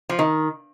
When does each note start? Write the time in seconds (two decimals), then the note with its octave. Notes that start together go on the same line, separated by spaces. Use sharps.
0.09 F3
0.19 D#3